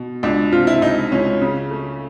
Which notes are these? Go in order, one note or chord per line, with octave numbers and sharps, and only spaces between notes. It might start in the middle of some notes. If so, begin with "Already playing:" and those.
Already playing: B2
C#2 D4
C3 F4
E4
C#2 D#4
C#2 C#4
C#3
A3